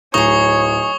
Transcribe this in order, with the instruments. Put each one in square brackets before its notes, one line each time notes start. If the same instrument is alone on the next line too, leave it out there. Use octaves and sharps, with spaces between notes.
[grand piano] D1 [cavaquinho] D#4 G#4 [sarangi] C#5 [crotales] C#6 D#6 G7